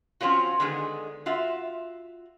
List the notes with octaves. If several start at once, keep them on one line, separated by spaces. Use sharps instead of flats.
F3 C4 C#4 F4 F#4
D3 D#3 G#3 B3 G#4
F4 F#4 E5